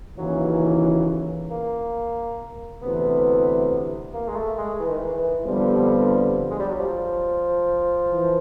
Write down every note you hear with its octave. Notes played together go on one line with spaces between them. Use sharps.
D#2 C#3 E3 F#3
A#3
D2 C3 E3 B3
A#3
G#3
A3
G#3
E3
D#3
E3
F2 D3 F3 G3 B3
G#3
G3
F#3
F3
E3